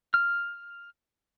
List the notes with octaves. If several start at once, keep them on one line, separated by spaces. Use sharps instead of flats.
F6